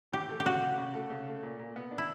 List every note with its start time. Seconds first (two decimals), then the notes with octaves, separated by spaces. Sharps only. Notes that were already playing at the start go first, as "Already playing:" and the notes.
0.12 E3 G4
0.29 A3
0.40 G4
0.45 C#3 F#4
0.62 C#3
0.78 C#3
0.94 A3
1.10 C#3
1.27 A3
1.43 A#2
1.59 A#2
1.76 B3
1.91 D4
1.98 E4